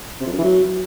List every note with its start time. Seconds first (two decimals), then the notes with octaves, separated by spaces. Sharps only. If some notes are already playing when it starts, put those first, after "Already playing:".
0.20 C3
0.26 F2
0.32 F#2
0.38 E3
0.44 F#3